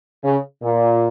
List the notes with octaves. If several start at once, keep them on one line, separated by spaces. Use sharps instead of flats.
C#3
A#2